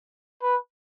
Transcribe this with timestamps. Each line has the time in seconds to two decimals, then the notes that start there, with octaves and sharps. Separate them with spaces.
0.42 B4